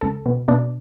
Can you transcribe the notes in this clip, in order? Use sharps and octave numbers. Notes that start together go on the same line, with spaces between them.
C#2 A4
B2
B2 D4